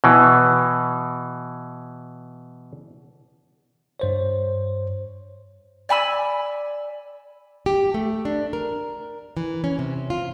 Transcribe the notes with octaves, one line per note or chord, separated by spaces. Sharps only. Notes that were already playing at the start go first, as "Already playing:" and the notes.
B2 E3
G2 C5 C#5
D5 G#5 B5 E6
G4
A3
D4
A#4
E3
C#4
C3
F4